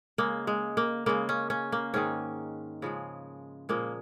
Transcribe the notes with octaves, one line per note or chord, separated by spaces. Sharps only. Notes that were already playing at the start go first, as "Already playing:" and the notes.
C#3 G#3 A#3
G#3
A#3
C#3 G#3 A#3
C#4
C#4
A#3
G#2 D#3 G#3 C#4
C#3 F3 G#3
A#2 F3 G#3 A#3